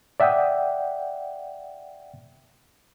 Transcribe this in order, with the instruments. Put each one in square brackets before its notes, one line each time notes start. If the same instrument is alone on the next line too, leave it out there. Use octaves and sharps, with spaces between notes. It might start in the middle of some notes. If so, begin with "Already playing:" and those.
[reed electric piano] D5 E5 F#5 G5 D#6